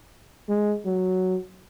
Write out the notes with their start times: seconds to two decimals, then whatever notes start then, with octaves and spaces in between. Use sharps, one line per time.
0.49 G#3
0.86 F#3